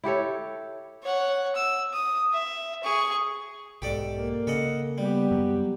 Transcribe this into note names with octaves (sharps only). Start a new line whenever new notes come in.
E4 G4 A4 C#5
C#5 F#5
E6
D#6
E5
G#4 C#6
B1 G#2 G4 A4 D5
A#3
C#3 A4 D#5 F#5
G3 B3 G4
F#2 F#3